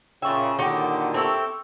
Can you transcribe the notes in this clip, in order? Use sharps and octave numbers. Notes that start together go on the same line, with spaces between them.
A#2 C#3 E5 G5 C#6
A#2 D3 D#3 F#4 G4 C#5 G5
C4 E4 G4 A4 A5 C#6